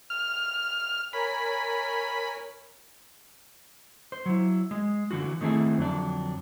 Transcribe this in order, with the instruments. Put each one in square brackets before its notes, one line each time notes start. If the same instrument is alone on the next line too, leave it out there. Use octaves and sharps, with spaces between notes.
[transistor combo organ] F6
[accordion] A#4 C#5 G#5 [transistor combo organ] B5
[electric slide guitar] C5
F#3 E4
G#3
D3 E3 F4 F#4
D#3 A3 C4 E4 G#4
F2 D3 F#3 D4